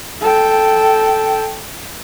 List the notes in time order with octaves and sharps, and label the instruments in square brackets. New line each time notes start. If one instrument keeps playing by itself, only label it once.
[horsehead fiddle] A4 G5